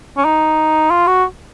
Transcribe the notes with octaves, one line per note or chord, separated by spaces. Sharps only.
C#4
D#4
F4
F#4